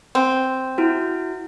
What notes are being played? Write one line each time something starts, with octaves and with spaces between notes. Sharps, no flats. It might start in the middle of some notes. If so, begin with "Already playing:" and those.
C4
E4 F#4